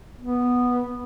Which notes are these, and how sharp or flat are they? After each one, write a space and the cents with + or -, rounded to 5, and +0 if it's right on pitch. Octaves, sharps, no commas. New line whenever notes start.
B3 -5